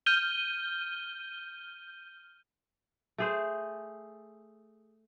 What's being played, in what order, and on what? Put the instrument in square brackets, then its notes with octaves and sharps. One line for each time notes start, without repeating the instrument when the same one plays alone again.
[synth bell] F6 G6 D#7 G7
[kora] A3 G#4 C5